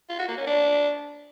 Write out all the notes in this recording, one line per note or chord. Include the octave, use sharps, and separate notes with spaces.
F4
F#4
A#3
C#4
D4